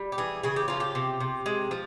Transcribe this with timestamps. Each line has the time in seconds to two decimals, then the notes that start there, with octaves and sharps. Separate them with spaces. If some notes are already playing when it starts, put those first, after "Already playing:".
Already playing: G3
0.12 G4
0.18 E3 G#4
0.43 C#3 G#4
0.56 G4
0.68 F3 F4
0.80 G4
0.95 C3
1.20 C3
1.46 G#3
1.71 F3